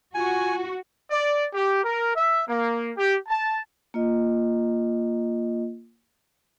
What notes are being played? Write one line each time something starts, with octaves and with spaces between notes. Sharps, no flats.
F4 F#4 G#5
D5
G4
A#4
E5
A#3
G4
A5
A#3 F4 D#5